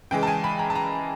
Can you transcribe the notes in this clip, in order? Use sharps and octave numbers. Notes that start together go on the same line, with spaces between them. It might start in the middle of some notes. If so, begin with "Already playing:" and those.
C#3 E3 G#3 G5
A5
G#5
B5
A#5
A5
A#5